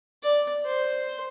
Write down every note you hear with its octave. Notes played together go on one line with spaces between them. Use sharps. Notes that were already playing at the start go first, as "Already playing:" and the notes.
D5
C5